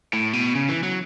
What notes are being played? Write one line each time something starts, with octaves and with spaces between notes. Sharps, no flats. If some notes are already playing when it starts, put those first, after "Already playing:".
A2
B2
C#3
E3
F#3